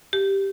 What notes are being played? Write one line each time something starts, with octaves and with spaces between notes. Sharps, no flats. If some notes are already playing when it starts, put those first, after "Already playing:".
G4